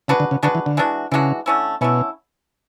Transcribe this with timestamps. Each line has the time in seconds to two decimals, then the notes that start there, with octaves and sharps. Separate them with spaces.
0.08 C#3 G#3 D4 F#4 B4
0.20 D3
0.31 C#3
0.43 D3 G#3 D4 F#4 B4
0.55 E3
0.66 D3
0.77 E3 G#3 D4 F#4
1.12 C#3 E3 G#3 D4 F#4
1.46 D3 A3 C#4 E4
1.81 B2 D3 A3 C#4 E4